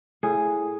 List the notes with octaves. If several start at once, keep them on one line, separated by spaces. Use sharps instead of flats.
A2 G#4